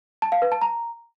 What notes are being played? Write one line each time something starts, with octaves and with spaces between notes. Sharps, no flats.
A5
F5
B4
A5
A#5